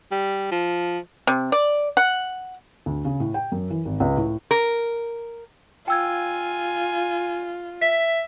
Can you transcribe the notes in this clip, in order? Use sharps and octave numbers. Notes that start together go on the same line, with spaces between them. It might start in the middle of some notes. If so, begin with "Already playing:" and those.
G3
F3
C3
D5
F#5
D2
C#3
A2
G5
F#2
E3
G#1
C#2
A2
A#4
F4 G5 G#5 E6 G#6
E5 B6